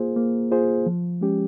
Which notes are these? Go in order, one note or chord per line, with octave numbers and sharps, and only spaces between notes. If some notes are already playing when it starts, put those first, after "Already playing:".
Already playing: A#3 F4 G#4 C5
A#3
F4 G#4 C5
F3
G#3 C#4 G4